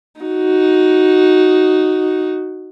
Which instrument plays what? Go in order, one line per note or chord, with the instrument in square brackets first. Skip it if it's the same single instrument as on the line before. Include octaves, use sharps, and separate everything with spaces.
[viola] D#4 F#4